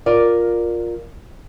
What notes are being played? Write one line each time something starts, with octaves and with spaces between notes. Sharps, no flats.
F4 A#4 D5